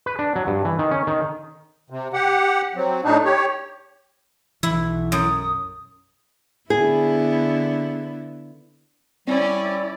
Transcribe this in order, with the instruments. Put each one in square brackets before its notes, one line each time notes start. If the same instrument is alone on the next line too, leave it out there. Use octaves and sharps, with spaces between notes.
[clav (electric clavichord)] B4
D4
F#3
G2
E3
D#3
C#4
D#3
[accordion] C3
G4 F#5
F#3 C4
A2 D4 D#4
G4 C#5
[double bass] B1 [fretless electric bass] E3 [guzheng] E4
[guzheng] F#2 [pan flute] D#6
[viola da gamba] D3 B3 E4 [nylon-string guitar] G#4
[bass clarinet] G3 [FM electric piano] C4 [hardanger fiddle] C#4 [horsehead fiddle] E4 D5